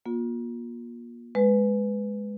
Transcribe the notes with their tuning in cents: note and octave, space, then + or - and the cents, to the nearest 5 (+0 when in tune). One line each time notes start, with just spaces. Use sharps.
A#3 +35 F4 +30
G#3 +0 B4 +10